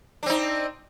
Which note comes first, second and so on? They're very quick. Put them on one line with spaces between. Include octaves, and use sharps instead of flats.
D4 C4 D#4